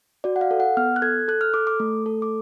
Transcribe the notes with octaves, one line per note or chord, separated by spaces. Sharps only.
F#4 D5
F#5
F5
A4
F#5
B3 F6
F#6
A4 G#6
A4 F#6
F6
A4 D6
D6
A3
A4
D6